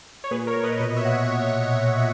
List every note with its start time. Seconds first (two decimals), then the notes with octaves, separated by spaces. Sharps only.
0.24 C#5
0.31 A#2 G#4 B4
0.47 A#4 C#5
0.56 A#2
0.64 B4 D#5
0.80 B2 B4 D#5
0.90 D#5
0.96 C#5 E5
1.04 B2 F#5